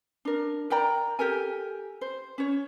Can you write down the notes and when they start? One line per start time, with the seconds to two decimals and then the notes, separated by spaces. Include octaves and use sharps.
0.25 D4 A#4
0.70 A#4 D5 G5 A#5
1.19 G4 A4 A#4 G#5
2.01 C5
2.38 C#4 C#5